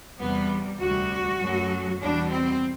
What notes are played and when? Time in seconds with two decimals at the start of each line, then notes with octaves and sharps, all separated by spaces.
0.19 E2 C3 G3 B3
0.80 D2 C3 G3 F#4
1.40 F#2 F#3 A3
2.00 E2 B2 G3 D4
2.30 C4